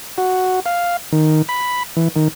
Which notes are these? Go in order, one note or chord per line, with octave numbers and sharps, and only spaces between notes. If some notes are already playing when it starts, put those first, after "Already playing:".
F#4
F5
D#3
B5
E3
D#3